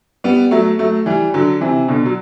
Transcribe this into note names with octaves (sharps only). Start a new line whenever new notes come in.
G3 B3
F#3 A3
F#3 A3
E3 G3
D3 F#3
C3 E3
B2 D3
F#3